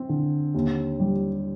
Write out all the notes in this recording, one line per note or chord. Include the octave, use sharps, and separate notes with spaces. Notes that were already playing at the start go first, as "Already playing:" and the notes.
Already playing: C4
D3
D#2
G3